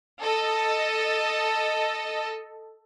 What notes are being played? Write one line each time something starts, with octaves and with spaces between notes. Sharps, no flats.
A4 D#5